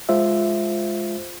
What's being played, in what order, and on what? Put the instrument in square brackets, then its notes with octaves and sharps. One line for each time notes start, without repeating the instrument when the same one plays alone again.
[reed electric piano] G#3 F4 C5 E5